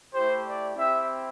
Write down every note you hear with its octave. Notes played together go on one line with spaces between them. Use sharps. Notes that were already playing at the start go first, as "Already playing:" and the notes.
A3 E4 G4 C5
D5
C4 E4 G4 E5